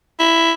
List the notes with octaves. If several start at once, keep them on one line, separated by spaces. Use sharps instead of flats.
E4